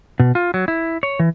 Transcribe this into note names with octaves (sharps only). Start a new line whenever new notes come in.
B2
F4
F#3
E4
C#5
E3